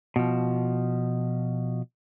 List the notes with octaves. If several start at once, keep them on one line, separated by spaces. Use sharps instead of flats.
B2 F3